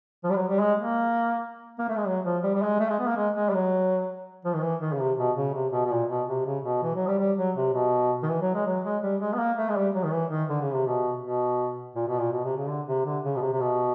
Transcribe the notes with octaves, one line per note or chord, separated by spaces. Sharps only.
F3
G3
F#3
G3
G#3
A#3
A#3
A3
G#3
F#3
F3
G3
G3
G#3
A3
G#3
B3
A#3
G#3
G#3
G3
F#3
F3
D#3
E3
D#3
C#3
C3
B2
C#3
C3
B2
B2
A#2
B2
C3
C#3
B2
E3
F#3
G3
G3
F#3
C3
B2
D#3
E3
F#3
G#3
F#3
G#3
G3
G#3
B3
A#3
A3
G#3
G3
F#3
D#3
E3
D#3
D3
C#3
C3
B2
B2
A#2
B2
A#2
B2
C3
C#3
D3
C3
D3
C#3
B2
C3
C3
B2